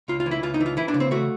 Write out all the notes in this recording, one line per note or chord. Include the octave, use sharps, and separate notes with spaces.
C#2 F4
F4
E3
E4
C#2 F4
D#4
E3
F4
E3 E4
D4
C#3
C4
A3 F#4